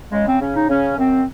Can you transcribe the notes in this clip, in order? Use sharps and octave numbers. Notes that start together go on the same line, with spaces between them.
C#3 G#3
C4
C#3 C#4
D#4
C#3 C#4
F#2 C4